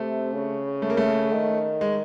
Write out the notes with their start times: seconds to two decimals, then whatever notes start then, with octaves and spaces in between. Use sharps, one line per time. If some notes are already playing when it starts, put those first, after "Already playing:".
Already playing: C3 A3
0.33 C#3
0.82 A3
0.90 A#3
0.97 A3
1.32 D#3
1.81 G#3